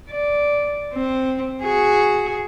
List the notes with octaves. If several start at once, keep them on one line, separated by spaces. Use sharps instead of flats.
D5
C4
F#4 G#4